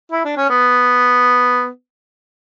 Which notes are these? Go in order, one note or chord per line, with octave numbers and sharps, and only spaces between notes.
E4
D4
C#4
B3